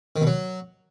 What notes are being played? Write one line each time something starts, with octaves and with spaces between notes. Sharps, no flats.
D#3
B2
F#3